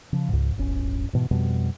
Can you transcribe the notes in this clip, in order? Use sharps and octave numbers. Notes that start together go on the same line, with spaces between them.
C#3 F3
C#2 G#2
D1 G1 C#4
G#2 B2 E3
F2 B2 G3